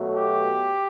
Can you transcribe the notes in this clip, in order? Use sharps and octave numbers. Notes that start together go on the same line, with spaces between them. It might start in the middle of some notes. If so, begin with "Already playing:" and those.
Already playing: B2 F#3 A3
G4